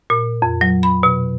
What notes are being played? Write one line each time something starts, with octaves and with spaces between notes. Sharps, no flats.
A#2
F2
F#3
B5
B2